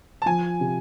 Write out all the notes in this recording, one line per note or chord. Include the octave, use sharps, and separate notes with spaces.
A5
F3 G#5
C3